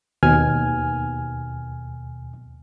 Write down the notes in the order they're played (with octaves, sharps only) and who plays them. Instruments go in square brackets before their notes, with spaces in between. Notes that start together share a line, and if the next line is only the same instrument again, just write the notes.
[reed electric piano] D#2 B2 G#5 F6